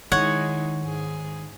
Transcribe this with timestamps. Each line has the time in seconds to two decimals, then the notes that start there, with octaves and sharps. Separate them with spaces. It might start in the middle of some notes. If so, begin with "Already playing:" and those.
0.12 D#3 G#3 D#4 E4 C#5 F#5
0.83 G#2 G#4